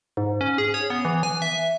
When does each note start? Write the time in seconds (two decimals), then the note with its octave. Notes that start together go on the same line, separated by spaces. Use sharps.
0.17 G#2
0.41 C#4
0.58 G#4
0.74 C#5
0.90 B3
1.05 E3
1.23 G#5
1.42 E5